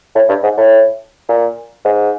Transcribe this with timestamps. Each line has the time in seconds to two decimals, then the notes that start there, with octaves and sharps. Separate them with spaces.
0.15 A2
0.29 G2
0.43 G#2
0.58 A2
1.29 A#2
1.85 G#2